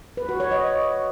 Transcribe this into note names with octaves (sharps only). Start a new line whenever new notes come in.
B4
F#4
C#5
D#5